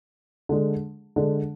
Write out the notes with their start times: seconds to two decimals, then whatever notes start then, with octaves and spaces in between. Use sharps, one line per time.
0.49 D3 G#3 D4
1.16 D3 G#3 D4